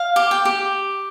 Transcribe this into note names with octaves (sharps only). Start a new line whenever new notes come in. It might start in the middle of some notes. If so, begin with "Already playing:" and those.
Already playing: F5
G4
G5
G4